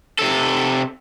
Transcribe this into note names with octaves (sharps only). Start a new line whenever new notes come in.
C3 A4